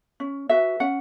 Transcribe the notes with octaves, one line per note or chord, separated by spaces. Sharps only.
C#4
F#4 B4 E5
C#4 F#5